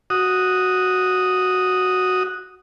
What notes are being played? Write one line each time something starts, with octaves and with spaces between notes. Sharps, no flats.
F#4 D#6